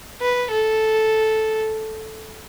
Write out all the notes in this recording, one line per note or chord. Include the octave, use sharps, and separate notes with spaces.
B4
A4